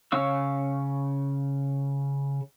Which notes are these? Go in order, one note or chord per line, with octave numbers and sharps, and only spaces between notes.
C#3 C#4 F5 C#6 E6